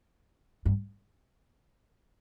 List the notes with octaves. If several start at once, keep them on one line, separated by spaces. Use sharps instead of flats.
G2